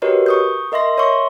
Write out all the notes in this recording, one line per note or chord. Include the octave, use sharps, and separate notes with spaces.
F#4 G4 A#4 B4 C#5 D#5
C#6 D#6 G6
A#4 D#5 E5 C6 A#6
C#5 E5 C6 C#6 E6